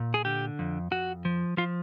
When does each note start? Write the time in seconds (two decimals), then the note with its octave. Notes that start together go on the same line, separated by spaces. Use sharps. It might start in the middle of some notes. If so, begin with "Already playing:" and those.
Already playing: A#2
0.14 G#4
0.25 D3 G4
0.59 F2
0.91 F2 F#4
1.25 F3
1.57 F3 F4